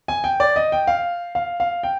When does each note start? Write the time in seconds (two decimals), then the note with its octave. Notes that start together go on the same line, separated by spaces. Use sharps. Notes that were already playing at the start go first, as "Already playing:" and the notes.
0.08 G#5
0.24 G5
0.40 D5
0.56 D#5
0.72 G5
0.87 F5
1.35 F5
1.60 F5
1.83 G5